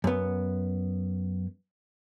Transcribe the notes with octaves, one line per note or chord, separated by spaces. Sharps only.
F#2 B3